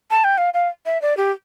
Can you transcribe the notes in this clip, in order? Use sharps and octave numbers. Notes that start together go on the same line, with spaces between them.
A5
G5
F5
F5
E5
D5
G4